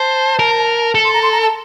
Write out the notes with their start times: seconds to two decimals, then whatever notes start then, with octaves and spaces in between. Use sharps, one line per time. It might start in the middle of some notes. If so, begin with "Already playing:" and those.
Already playing: C5 A5
0.39 A#4
0.95 A4
1.04 C6
1.14 A#5
1.23 C6
1.32 A#5
1.42 A5